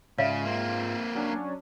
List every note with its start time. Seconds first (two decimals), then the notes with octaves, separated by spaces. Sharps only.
0.18 G#2 C#3 F4 D5 E5 F5
0.45 A#3 C4
1.15 F#3 C#4 D4